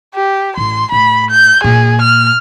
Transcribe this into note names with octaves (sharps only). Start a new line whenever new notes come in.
G4
A1 C6
A2 B5
G6
A#2 G#4
F6